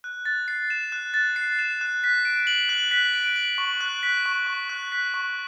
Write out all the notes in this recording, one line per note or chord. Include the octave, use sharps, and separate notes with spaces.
F#6
A6
C7
E7
F#6
A6
C7
E7
F#6
B6
D7
F#7
F#6
B6
D7
F#7
C#6
F#6
B6
C#6
C#6
F#6
B6
C#6